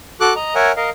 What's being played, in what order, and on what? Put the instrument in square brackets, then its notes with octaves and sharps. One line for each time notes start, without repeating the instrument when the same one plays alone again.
[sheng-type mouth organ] F#4 A4 D6 F#6
D#5 A#5
A#4 C#5 E5 F#5 G#5
A#4 D#5 F5